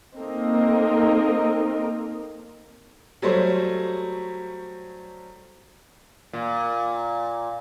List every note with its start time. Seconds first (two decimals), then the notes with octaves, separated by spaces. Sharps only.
0.19 A#3 C4 D#4 A4 A#4 D#5
3.22 F#3 G3 A3 C5 C#5
6.33 A#2